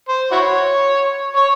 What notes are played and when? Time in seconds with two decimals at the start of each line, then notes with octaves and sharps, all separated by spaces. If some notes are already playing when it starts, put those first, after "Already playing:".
0.09 C5
0.32 E4 F#4 C#5
1.36 C#5